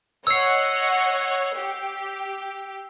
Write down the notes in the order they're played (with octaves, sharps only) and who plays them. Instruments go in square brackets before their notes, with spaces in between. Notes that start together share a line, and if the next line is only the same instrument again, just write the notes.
[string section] C#5 D#5 F#5 [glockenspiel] E6 C7
[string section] G4